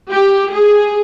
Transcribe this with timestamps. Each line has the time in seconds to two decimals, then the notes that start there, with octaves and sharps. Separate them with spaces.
0.12 G4
0.53 G#4